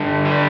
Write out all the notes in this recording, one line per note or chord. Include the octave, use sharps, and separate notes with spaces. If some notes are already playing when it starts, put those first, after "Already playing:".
Already playing: G2 D3
G3